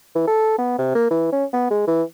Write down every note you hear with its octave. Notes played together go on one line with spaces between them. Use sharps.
E3
A4
B3
C3
A#3
E3
C#4
B3
G#3
E3